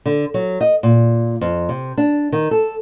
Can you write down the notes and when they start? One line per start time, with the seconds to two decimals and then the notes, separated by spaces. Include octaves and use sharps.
0.06 D3
0.34 F#3
0.61 D#5
0.83 A#2
1.41 F2
1.69 C3
1.98 D4
2.32 D#3
2.51 A4